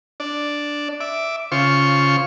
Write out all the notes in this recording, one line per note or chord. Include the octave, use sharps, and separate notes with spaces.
D4 D5
E5 D6
C#3 F4 C5 C#6